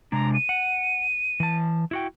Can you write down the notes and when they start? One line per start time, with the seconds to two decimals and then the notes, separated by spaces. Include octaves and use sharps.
0.12 C3 G#3 D4 A#5
0.34 D#7
0.49 F#5
1.40 E3 A5
1.91 E4 F#4 G5